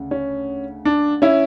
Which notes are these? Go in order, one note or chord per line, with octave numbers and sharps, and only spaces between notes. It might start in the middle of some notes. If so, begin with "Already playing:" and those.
Already playing: D2 C#3
C#4
D4
C#4 E4